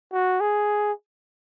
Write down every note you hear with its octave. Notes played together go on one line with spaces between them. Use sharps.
F#4
G#4